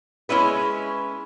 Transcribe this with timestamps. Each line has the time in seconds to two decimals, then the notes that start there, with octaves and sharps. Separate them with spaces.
0.29 G#3 C#4 E4 B4